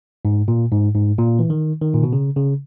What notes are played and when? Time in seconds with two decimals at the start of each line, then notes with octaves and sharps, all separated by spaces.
0.25 G#2
0.48 A#2
0.72 G#2
0.95 G#2
1.18 A#2
1.39 E3
1.50 D#3
1.81 D#3
1.94 A#2
2.03 B2
2.13 C#3
2.36 C#3